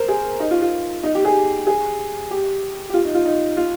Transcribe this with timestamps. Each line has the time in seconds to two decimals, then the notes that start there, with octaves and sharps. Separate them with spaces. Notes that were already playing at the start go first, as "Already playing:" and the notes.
Already playing: A#4 C5
0.08 G#4
0.40 D#4
0.51 F4
0.62 F4
1.04 D#4
1.15 G4
1.25 G#4
1.67 G#4
2.31 G4
2.90 G4
2.94 F4
3.05 D#4
3.14 F4
3.25 D#4
3.57 F4